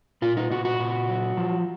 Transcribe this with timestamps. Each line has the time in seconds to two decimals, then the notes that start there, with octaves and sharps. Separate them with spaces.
0.22 A#2 F4
0.37 D#4
0.50 A#2 F#4
0.65 F#4
0.80 A#2
1.09 F#3
1.37 F3